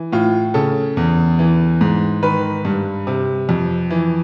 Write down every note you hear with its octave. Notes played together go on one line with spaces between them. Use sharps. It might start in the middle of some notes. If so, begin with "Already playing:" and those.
Already playing: E3
A2 F4
C#3 A4
E2
E3
G#2
D#3 B4
G2
C3
F2
E3